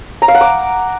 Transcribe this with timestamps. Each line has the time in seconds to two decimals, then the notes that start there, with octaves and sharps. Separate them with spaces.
0.22 A#5
0.28 F5
0.35 F#5
0.41 D6